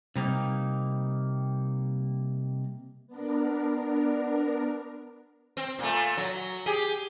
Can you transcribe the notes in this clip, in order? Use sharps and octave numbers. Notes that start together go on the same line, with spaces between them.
C3 G3 A#3 D#4
B3 D4 A#4
C4
A#2 A3
F#3
G4 G#4